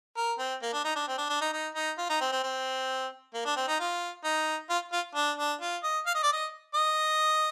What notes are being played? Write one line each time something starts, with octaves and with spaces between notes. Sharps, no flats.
A#4
C4
A#3
D4
D#4
D4
C4
D4
D4
D#4
D#4
D#4
F4
D#4
C4
C4
C4
A#3
D4
C4
D#4
F4
D#4
F4
F4
D4
D4
F4
D#5
F5
D#5
D5
D#5
D#5